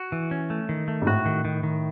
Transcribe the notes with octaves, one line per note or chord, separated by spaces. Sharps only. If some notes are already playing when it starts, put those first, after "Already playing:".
Already playing: F#4
E3
C#4
A3
D#3
A3
G#2
A2 F#4
D#3
D#3
D#3